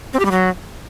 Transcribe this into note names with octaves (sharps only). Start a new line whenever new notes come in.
C4
G4
G3
F#3